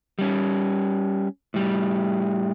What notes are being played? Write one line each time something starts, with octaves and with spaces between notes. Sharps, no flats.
G3 C#4
A2 G3